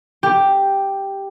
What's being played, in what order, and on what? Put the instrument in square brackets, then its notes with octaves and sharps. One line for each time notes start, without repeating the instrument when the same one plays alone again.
[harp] G4